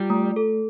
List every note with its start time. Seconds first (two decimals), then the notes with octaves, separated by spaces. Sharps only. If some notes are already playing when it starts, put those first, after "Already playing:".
Already playing: G3 F4
0.10 A3
0.36 A4